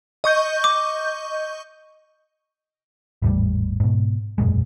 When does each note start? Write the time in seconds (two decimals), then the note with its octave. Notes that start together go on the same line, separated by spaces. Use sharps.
0.24 D#5 C#6 G6
0.64 D6
3.22 G#1 E2 A2 G3
3.80 G#2 B2
4.38 E1 F#2 A#2 G#3